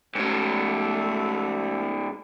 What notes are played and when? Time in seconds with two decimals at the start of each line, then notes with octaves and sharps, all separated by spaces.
0.15 G#2 A3 C#4